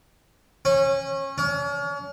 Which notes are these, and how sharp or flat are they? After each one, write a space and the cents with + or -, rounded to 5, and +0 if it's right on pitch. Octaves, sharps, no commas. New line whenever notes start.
C#4 -25
C#4 +40